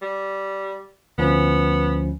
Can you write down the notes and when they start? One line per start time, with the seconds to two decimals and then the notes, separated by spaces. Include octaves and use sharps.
0.02 G3
1.18 D2 F3 B3 C#4